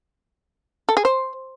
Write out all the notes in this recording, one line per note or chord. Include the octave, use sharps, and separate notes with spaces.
A4
G#4
C5